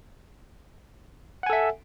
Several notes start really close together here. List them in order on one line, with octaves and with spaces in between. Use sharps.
F#5 G#5 A4 E5